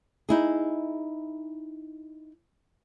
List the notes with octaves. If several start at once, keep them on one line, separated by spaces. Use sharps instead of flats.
D#4 E4 G#4